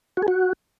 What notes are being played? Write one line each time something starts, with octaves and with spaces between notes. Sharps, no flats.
F#4
G#4
F#4